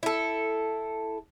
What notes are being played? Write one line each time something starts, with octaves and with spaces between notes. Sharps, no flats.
E4 A4